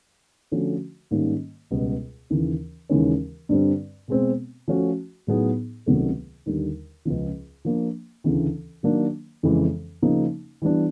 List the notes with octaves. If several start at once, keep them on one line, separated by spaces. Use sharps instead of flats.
D3 F3 A3 C#4 F#4
G#2 D#3 G3 A#3 C#4
C#2 B2 G3 B3
D#2 C#3 E3
D#2 C#3 E3 G#3 C#4
G2 D3 G3 C4
B2 G#3 C4
F3 A3 C#4 F#4
A2 F#3 B3 D#4 G#4
C#2 C3 D#3 F#3 A3
D#2 D3 G3
C#2 C#3 F3
F3 A#3 D4
D2 C#3 E3
D#3 F#3 A#3 D4
F2 C#3 E3 G#3
C#3 F3 A#3 D#4
E3 G3 B3 D4